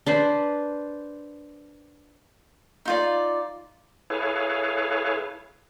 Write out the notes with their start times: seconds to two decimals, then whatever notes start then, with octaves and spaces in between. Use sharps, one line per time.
0.06 D4 B4 C5
2.85 D#4 F4 D5
4.10 E4 G#4 A4 B4 C#5 F5